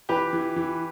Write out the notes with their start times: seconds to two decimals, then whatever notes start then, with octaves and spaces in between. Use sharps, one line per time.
0.09 E3 G4 B4
0.33 E3
0.56 E3